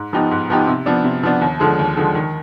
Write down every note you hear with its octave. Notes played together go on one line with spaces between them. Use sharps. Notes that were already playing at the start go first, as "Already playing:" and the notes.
Already playing: G#2
F3 B3 D#4 G4
G#2
F3 B3 D#4 G4
C3
F3 B3 D4
C3
F3 B3 D4
D#2
D3 F3 G#3
D#2
D3 F3 G#3
D#3